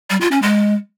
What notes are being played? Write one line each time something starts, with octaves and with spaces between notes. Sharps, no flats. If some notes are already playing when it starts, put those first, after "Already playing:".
G3
F4
C#4
G#3